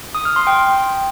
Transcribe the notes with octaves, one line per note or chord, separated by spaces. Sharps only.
D#6
F6
C6
G5